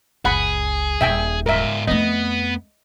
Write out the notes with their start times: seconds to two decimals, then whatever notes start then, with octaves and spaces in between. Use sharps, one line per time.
0.25 F#1 C#2 G#4 F#5 B5
1.01 D#1 D#2 E5 G5 G#5
1.46 G#2 F4 A#4 E5
1.87 F2 A3 B3 D#5